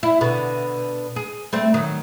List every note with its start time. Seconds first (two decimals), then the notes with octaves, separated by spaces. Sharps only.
0.03 E4
0.21 B2 D3
1.16 G#4
1.53 G3 A3 C4
1.74 D#3 F#3